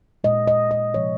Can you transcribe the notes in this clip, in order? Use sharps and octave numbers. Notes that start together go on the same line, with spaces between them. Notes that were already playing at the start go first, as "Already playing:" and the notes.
A#2 G#3 D#5
D#5
D#5
C3 F3 G#3 C#5